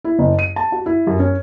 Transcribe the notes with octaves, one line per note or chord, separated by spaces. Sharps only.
E4
F#1
D#7
A5
F#4
E4
F#2
C#4